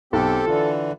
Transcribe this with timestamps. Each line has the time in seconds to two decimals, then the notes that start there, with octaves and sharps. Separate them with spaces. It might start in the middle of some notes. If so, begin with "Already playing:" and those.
0.13 B1 C4 G4 A4
0.47 D3 E3 F4